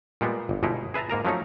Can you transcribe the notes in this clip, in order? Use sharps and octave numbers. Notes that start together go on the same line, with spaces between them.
A#2 G3 G#3 B3
G1
G1 B2 G#3 D#4 E4
G#4 B4 E5 A5 A#5
G#2 A#3 A#4 A#5
F3 F#3 A3 C#4 D#4